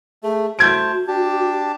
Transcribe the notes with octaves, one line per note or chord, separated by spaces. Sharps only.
A3 G#4
A3 F#4 C5 A5 G6 G#6 D7
D4 G4 A5